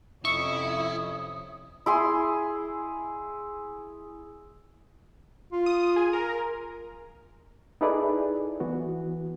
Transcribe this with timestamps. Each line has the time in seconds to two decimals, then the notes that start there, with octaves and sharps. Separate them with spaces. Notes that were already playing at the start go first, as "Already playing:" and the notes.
0.25 F2 C3 C#4 E4 C#6 D#6
1.86 E4 G#4 C6
5.52 F4
5.66 D#6
5.96 G#4
6.13 A#4
7.81 D#4 E4 G#4 A4 B4 D5
8.60 E3 B3 F#4